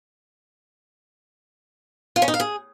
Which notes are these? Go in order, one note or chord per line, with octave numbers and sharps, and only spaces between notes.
F4
C#4
D#4
F5
G#4